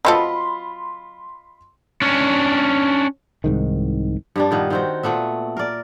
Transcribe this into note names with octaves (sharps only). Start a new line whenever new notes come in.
F#3 C4 F4 A4 D#5 B5 C6
C#4 D4
C2 G#2 D#3
G2 G3 D4
A#2 D#3 B3
D#3 C4 F#4
A#2 A3 B3 E5
A#4 D5